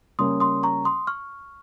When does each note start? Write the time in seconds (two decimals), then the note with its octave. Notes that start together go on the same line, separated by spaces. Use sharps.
0.19 C#3 G3 A#3 C#4 C6 D#6
0.40 C6 D#6
0.63 A#5 C#6
0.85 C6 D#6
1.07 C#6 F6